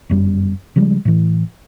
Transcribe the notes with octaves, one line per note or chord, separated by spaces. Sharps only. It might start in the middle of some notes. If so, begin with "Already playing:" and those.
G1 F#2 G3
C#3 F3 G3 G#3
A2 E3